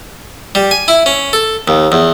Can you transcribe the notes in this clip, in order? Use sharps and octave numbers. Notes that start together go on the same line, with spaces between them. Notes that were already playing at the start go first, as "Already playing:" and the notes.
G3
G#5
E4
C#4
A4
D#2
E2